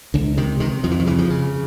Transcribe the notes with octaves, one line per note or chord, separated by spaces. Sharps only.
C#2 D3
C3 D#3
C3 D#3
F2 F3
E3
D#3
C#3 E3
F3
C#3